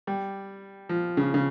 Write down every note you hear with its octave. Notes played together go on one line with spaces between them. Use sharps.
G3
F3
C#3
C#3